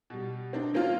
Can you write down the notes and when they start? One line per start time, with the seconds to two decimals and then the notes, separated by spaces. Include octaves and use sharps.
0.10 B2 G3
0.53 C4 D4 D#4
0.73 D#3 F#3 A#3 C4 C#4 F4